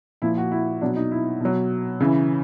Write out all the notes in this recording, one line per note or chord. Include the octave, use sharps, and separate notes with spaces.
A#2 F3 E4
F#4
E4
B2 F#3 D4
D#4
E4
B2 F#3
C#3 E3